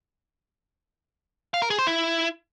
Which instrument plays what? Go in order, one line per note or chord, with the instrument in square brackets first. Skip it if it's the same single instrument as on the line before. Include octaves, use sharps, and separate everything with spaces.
[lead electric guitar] F5
A#4
G#4
C5
E4